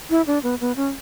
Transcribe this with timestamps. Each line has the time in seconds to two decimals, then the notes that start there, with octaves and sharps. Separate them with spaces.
0.10 E4
0.27 D4
0.43 B3
0.60 B3
0.76 C#4